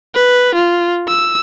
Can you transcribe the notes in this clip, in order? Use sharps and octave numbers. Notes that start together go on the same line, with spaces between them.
B4
F4
E6